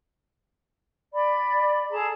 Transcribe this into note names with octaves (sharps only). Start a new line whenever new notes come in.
D5 B5
G#4 A4 A5 A#5